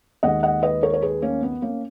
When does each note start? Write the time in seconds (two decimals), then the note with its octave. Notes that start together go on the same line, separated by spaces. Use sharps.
0.23 D#2 D#3 G#3 D#5 F#5
0.43 D#5 F#5
0.63 B4 D#5
0.83 A#4 C#5
0.94 C#5
1.02 G#4 B4
1.22 A#3 C#4
1.42 B3
1.62 A#3 C#4